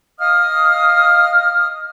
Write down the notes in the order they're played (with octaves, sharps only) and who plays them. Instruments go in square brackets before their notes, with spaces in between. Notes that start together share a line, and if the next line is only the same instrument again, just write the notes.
[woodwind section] D#5 F5 D#6 F6